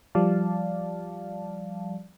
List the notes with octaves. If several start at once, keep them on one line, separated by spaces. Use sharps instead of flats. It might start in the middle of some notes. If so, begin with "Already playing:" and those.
F3 G3 D5 F5 A5